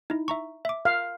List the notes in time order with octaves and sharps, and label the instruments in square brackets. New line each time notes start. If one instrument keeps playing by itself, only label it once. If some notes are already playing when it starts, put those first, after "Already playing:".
[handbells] D#4 E4
E5 A#5 C#6
E5 D6
[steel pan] F5